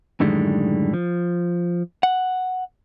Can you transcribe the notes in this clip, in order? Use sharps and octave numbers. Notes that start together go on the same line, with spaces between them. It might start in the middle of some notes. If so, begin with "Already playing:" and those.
F#2 A2 D3 D#3 G3 G#3
F3
F#5